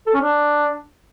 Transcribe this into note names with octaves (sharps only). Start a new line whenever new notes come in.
A4
C#4
D4